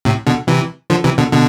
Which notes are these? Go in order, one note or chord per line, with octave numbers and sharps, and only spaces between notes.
A2 C3
B2 D3
C3 E3
D3 F3
C3 E3
B2 D3
B2 D3